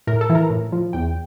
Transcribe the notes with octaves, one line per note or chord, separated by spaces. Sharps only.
A2 A#4
A4
E3
A#4
A2
F3
E2 G5